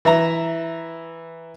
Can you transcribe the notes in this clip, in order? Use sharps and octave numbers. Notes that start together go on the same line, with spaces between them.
E3 E5 A#5